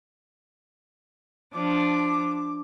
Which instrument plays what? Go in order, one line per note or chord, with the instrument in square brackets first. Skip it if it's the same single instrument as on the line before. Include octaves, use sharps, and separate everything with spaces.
[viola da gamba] F3 D4 [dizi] D6